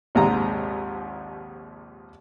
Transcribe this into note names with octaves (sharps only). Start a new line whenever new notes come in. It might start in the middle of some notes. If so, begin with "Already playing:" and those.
A#1 D#2 G#2 C3 A#5